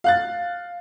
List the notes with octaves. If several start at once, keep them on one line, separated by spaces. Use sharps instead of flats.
F5 F#6 A6